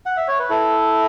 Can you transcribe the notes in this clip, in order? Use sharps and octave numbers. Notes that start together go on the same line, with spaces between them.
F#5
E5
C#5
B4
E4 A4